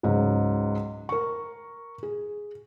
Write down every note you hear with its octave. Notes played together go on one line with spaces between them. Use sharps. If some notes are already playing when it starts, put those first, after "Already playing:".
C#2 G#2 F#3
A#4 C#6
G#4